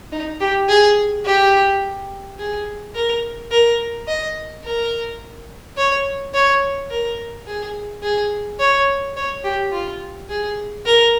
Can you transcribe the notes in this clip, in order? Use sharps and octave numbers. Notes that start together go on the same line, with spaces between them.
D#4
G4
G#4
G4
G#4
A#4
A#4
D#5
A#4
C#5
C#5
A#4
G#4
G#4
C#5
C#5
G4
F4
G#4
A#4